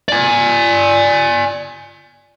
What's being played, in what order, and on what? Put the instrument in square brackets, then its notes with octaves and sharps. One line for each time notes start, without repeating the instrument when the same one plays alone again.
[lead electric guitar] D5 G#5